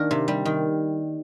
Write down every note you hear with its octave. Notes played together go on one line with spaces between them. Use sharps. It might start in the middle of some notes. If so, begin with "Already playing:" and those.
Already playing: D#3 A#3 D4 A#4
C3
G3
D#3